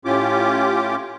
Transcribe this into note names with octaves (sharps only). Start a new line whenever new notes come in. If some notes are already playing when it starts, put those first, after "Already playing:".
A2 C#4 F4 G4 D6